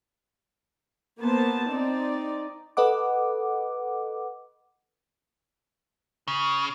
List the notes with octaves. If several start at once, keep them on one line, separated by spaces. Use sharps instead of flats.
A#3 B3 C5 A5
C4 D#4 D5
A4 B4 D#5 F#5 D6
C#3